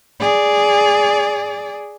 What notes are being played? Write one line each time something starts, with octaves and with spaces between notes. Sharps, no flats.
G#4 D5